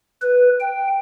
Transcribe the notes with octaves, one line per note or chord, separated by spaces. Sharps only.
B4
G5